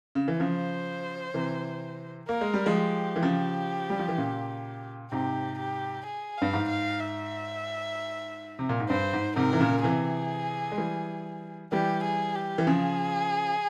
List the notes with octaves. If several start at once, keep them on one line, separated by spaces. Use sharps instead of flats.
C#3
E3
C#3 F3 C5
C3 E3
A#3 A#4
G#3
G3
F3 G#3
G4
E3
C#3 F3
G3
F3
E3
A#2 C#3
G#2 C3 G4
G4
G#4
G2 F5
G#2
F5
E5
C3
A#2
G#2
G2 C5
G#2
G#2 C3 A#4
E3
A#2 C#3
C#3
C3 E3 G#4
G#3
E3 G3
E3 G3 G4
G#4
G4
E3
C#3 F3 G#4